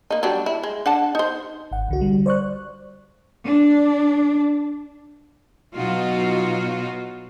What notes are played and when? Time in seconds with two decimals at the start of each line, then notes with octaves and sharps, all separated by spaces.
0.10 A#3 D#4
0.23 F#3 G3 D4
0.46 E4
0.63 G#3
0.86 D4 F#5 A5
1.15 D#4 C5
1.72 G#1 F#5
1.88 C2 D3 F#4
2.01 D3 G3
2.26 C5 D5 C#6 F#6
3.45 D4
5.74 B2 F#3 D#4 F4 F#4